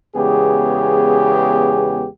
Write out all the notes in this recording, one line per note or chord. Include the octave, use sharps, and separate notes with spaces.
E2 C#3 G#3 B3 G4 G#4